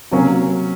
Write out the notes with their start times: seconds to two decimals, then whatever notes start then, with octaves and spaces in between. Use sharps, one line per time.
0.11 C3 F#3 A#3 C#4